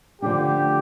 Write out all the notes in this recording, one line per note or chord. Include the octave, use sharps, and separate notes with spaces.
D3 F3 A3 D4 G4